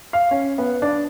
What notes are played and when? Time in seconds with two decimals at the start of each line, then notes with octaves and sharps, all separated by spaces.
0.13 F5
0.31 C#4
0.58 B3
0.82 D4